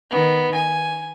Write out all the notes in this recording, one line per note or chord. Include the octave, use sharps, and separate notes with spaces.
D#3 B3
G#5